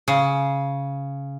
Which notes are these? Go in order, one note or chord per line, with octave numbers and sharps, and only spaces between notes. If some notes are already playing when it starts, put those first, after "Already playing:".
C#3